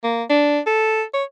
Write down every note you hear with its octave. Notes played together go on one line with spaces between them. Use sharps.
A#3
D4
A4
C#5